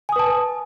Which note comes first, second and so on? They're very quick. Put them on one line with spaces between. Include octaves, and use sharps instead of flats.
G#5 D#6 B4 A5